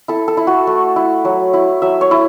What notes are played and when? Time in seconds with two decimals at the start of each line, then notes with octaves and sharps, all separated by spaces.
0.08 E4 A4
0.28 A4
0.37 E4
0.47 F#4
0.67 A3
0.96 E4
1.25 F#3
1.53 E4
1.82 F#3 E5
2.01 C#5
2.11 E4